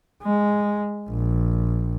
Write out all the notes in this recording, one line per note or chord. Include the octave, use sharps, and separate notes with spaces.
G#3
A#1